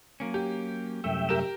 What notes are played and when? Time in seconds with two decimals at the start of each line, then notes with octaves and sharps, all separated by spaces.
0.20 F#3 A#3 C#4
0.34 G4
1.04 C2 F#2 A3 E5 G5
1.29 G4 A#4 E7